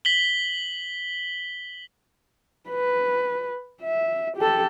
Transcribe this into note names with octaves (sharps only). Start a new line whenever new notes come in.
B6 F#7 G7
B4
E5
G4 A4